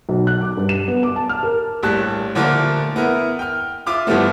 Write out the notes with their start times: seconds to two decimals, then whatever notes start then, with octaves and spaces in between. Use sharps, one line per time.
0.09 B1
0.27 F#6
0.41 D6
0.57 G2
0.69 E7
0.88 B3
1.03 D6
1.16 A5
1.29 F6
1.43 A#4
1.83 A#1 A2 G3 A5 F#6
2.35 A#2 D3 F3 A3 A#3 A#4
2.96 B3 E4 A#4
3.39 G5 F6
3.86 F4 E5 D6 F6
4.07 G2 E3 F3 G3 A3 B3